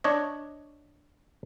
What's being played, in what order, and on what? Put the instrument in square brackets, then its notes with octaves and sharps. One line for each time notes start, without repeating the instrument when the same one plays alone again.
[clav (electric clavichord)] D4 C#5 D#5